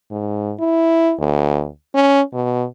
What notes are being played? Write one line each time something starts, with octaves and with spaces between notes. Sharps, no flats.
G#2
E4
D2
C#4
B2